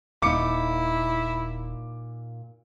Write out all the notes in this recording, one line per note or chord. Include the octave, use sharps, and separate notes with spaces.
D#1 A#2 D#4 E4 D6 C#7